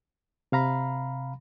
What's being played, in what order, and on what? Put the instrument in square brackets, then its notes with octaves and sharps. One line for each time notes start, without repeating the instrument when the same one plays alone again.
[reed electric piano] C3 F5 A#5 B5